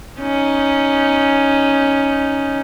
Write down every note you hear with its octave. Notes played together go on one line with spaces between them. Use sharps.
C#4 D#4